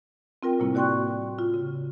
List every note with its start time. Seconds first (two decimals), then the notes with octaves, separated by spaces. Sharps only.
0.43 C4 F4 A#4 G5
0.60 A2 C3 G3 A#3 E4
0.75 F#4 D5 G5 C6 C#6 F#6
1.39 F4
1.54 C#3